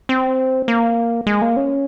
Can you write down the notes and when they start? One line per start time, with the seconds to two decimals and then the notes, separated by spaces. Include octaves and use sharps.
0.09 C4
0.68 A#3
1.27 G#3
1.42 A#3
1.57 C#4